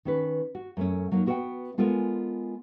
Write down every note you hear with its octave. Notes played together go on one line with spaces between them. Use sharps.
D#3 C#4 B4
F#4
F#2 A3 C#4
F#3 A#3 D#4
B3 F#4 A#4 E5 F#5 G5
G#3 B3 F4 A4 A#4 G#5